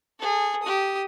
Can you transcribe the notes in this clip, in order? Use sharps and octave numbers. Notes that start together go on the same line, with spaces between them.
G#4 A4
G4 D#6